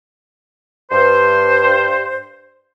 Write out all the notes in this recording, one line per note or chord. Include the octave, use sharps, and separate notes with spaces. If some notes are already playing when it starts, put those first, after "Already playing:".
G2 C5